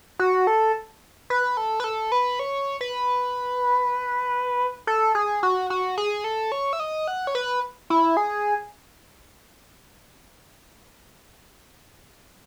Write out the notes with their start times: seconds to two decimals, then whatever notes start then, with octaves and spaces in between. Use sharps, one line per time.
0.19 F#4
0.47 A4
1.30 B4
1.57 A4
1.80 B4
1.84 A4
2.12 B4
2.39 C#5
2.81 B4
4.87 A4
5.15 G#4
5.43 F#4
5.70 F#4
5.98 G#4
6.24 A4
6.52 C#5
6.73 E5
6.80 D#5
7.08 F#5
7.27 C#5
7.35 B4
7.90 E4
8.17 G#4